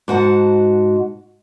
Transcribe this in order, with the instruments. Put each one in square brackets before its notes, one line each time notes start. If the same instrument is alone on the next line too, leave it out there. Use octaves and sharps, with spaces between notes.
[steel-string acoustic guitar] G#2 F#4 F#5 A5